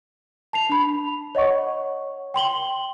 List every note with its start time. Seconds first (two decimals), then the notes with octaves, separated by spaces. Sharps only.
0.53 A5 C7 F7
0.69 D4 B5
1.35 C#5 D#5 F#5 C#6
2.34 G5 C6 F#7 G7